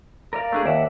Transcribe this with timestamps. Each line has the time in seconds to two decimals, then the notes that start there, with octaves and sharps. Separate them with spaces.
0.33 A#4 D5 F5
0.52 A3 D4 G#4
0.66 D#2 D5 E5 F#5